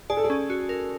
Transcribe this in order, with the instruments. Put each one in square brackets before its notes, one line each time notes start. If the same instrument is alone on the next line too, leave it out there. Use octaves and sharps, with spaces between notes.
[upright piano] G#4 [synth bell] D5
[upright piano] A4
G#4
[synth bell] C#4
F#4
A#4